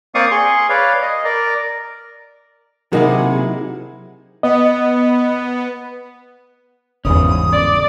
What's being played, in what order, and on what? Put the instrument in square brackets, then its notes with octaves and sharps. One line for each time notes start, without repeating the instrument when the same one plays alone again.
[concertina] A#3 C4 D5 F5 C#6 D#6
G#4 C6 C#6
B4 C#5 D5 F5
D#5
A#4 D5
[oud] C3 D#3 A#3 [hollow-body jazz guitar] F#3 D#4 E4 [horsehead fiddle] G#4 F#5
[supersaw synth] B3 [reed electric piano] D#5
[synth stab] G1 E2 [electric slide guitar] G#2 C#3 C#4 [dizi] D#6
[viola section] D5